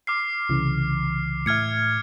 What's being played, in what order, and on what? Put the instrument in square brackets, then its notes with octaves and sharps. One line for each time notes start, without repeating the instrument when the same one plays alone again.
[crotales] D6 F6 C7
[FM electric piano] C2 C#3 E3
[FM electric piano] A2 E5 [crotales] F6 G#6 C#7